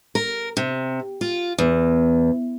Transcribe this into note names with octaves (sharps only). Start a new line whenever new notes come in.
A#4
C3
F4
E2